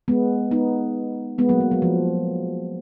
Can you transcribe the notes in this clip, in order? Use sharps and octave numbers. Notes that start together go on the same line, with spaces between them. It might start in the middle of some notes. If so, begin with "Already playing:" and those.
G#3 B3
B3 D#4
G#3 B3
F#3 A#3
G#3
F#3
F3